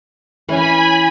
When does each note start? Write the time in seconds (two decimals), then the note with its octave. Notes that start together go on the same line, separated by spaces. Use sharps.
0.48 E3 C#4 E4 G#5 B5